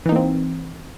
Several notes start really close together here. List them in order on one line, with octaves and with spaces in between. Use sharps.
E3 D#4 A#3 C4